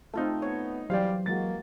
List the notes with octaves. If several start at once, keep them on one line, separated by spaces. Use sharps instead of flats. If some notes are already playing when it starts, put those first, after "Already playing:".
A3 C4 D#4 F4 A4
B3 C#5
E3 F#3 G3 G4 C5 D5 F5
E3 G#3 A#3 F#4 A6